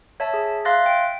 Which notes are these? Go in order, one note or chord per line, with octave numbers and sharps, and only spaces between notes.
C#5 E5 A5
G#4
E5 F5 C6 F#6 A6 A#6
G5